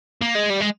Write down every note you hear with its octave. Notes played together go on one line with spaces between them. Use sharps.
A#3
G#3
G3
G#3